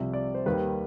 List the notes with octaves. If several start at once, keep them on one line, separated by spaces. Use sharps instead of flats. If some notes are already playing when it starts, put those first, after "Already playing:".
Already playing: C2 C3 F3 E5
D5
C5
D#2 D#3 G3 B4